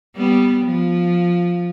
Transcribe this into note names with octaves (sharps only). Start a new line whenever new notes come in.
G3 B3
F3